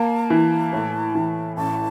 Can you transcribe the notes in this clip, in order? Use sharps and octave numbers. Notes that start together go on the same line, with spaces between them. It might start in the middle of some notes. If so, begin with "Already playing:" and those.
Already playing: A#3 A5
E3
A2
E3
A1 A5